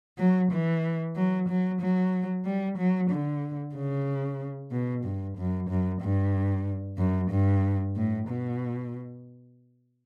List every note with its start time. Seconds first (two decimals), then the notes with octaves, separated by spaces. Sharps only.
0.18 F#3
0.52 E3
1.16 F#3
1.49 F#3
1.81 F#3
2.45 G3
2.78 F#3
3.10 D3
3.75 C#3
4.71 B2
5.04 G2
5.37 F#2
5.69 F#2
6.01 G2
6.98 F#2
7.31 G2
7.96 A2
8.28 B2